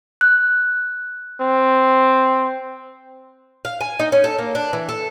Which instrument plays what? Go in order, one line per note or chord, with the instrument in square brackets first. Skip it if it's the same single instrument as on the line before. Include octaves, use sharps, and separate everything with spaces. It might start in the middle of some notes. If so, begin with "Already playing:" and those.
[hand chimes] F#6
[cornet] C4
[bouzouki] F5
G#5
D#4
C#4
A4
A#3
D4
E3
A4